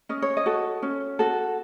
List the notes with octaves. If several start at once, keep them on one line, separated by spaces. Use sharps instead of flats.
C#4 D#5
C#5
D#5
F#4 A4
C#4
F#4 A4